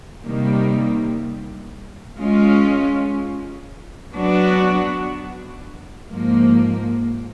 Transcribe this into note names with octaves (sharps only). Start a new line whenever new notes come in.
C3 D#3 G3 A#3
G#3 C#4 F4
F#3 B3 D4 F#4
G#2 F3 A#3